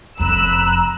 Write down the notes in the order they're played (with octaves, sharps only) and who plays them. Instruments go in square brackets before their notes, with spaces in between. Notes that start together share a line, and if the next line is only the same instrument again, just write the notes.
[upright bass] F1 F2 [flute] A#5 [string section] B5 E6 F#6